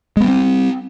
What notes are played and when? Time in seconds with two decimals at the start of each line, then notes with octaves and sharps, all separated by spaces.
0.17 G#3
0.21 B3
0.24 G3
0.28 C4